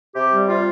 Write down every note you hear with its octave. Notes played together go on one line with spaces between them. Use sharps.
C3 G4
G3
C3 F4